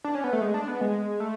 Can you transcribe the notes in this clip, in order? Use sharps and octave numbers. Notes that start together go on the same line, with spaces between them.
D4
C#4
B3
A3
G#3
D4
B3
G#3
A3